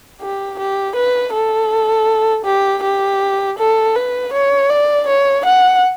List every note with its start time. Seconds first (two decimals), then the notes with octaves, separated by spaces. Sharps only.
0.21 G4
0.59 G4
0.96 B4
1.33 A4
2.45 G4
2.83 G4
3.59 A4
3.96 B4
4.34 C#5
4.70 D5
5.07 C#5
5.46 F#5